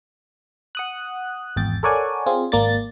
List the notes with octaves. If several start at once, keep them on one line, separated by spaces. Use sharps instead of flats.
F#5 D#6 F#6
G#1 E2 G5 A6
A4 A#4 C#5 D5 F#5 G#5
C4 F4 G#4
G#1 A#3 D5 A6